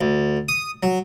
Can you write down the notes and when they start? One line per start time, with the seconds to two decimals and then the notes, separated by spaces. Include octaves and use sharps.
0.01 D2
0.49 D#6
0.83 F#3